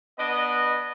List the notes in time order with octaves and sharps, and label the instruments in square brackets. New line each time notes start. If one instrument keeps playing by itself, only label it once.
[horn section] B3 D4 D#5